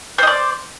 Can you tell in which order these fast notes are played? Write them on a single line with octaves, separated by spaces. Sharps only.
C5 D#5 D5